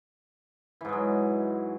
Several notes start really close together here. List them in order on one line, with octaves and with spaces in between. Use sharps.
E3 G#2 G#3 F#3